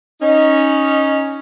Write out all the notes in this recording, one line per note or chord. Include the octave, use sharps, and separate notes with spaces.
C#4 D#4